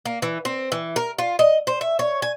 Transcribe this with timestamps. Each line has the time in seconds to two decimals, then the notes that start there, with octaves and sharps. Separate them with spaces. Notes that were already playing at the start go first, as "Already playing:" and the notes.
0.05 A#3
0.22 E3
0.45 C4
0.72 E3
0.96 A#4
1.18 F4
1.39 D#5
1.67 C5
1.81 E5
1.99 C#5
2.22 G#5